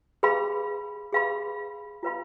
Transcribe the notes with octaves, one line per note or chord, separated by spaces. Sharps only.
G#4 B4 F5 B5
G#4 B4 F5 B5
F4 B4 F5 B5